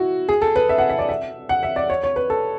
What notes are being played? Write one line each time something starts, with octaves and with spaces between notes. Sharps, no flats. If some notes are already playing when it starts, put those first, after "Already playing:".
Already playing: E4 F#4
G#4
A4
B4
E5
F#5
E5
D5
E5
F#5
E5
D5
C#5
C#5
B4
A4